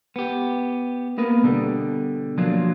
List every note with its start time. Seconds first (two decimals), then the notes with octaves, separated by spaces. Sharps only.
0.16 B3 G4
1.18 A#3 B3 A#4 B4
1.43 B2 D3 G3
2.38 F3 F#3 A#3 D4 F4